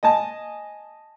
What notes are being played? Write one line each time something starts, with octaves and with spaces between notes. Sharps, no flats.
D#5 G#5 A5